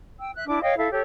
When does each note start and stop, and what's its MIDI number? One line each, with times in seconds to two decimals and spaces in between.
0.18 0.31 79
0.18 0.31 88
0.34 0.44 76
0.34 0.44 90
0.47 0.60 62
0.47 0.60 64
0.47 0.60 86
0.62 0.74 73
0.62 0.74 75
0.62 0.74 77
0.62 0.74 79
0.77 0.88 64
0.77 0.88 69
0.77 0.88 76
0.77 0.88 77
0.90 1.02 67
0.90 1.02 69
0.90 1.02 73